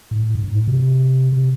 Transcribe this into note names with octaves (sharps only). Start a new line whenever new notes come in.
A2
G2
A2
C3
C3